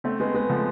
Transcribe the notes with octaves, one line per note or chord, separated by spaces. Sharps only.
A3 C4
G#3 B3
G#3 B3
F3 A3